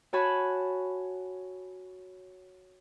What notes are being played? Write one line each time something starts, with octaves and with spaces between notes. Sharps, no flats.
F#4 C#5 G#5 A5 B5 F#6